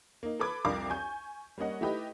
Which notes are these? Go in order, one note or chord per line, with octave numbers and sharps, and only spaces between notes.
A#3 D#4
A4 B4 B5 D6 G#6
C2 F2 D4 A#4 F5 D6
G#5 C#6 G6
G3 A#3 C#4 D#5 F#5
A3 D#4 E4 G4 B4 D#5